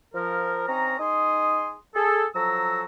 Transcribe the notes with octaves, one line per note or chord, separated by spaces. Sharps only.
F3 A#4
C4 C#4 D#4 A#5
D#4 G#4 C6 D#6
G#4 A4
F3 F#3 A4 A#5 E6